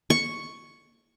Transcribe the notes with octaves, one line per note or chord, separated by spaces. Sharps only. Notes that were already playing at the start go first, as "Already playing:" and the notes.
C#6